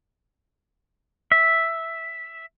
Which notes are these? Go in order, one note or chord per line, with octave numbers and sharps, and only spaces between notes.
E5